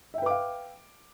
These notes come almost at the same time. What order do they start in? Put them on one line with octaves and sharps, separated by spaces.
E5 G5 B4 D6 F5